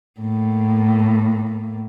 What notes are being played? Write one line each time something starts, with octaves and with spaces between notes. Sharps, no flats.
A2 A#3